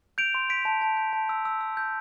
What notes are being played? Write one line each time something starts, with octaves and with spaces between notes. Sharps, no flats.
G6 D7 F7
C6
C6 B6 D7
A5
A5
G6
A5
E6
E6
E6
G6